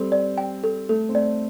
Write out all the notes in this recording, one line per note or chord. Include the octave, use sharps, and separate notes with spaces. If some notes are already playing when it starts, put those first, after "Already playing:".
Already playing: G3 C4 A4
D5
G5
A4
A3 A4
C4
A3 D5